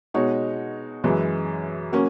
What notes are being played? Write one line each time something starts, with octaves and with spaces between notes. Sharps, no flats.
B2 G#3 D#4 F#4 C#5
F#2 E3 G#3
F#3 A#3 C#4